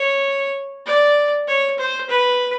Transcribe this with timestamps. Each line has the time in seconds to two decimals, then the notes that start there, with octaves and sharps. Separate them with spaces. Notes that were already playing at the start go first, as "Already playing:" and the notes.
Already playing: C#5
0.86 D5
1.47 C#5
1.78 C5
2.09 B4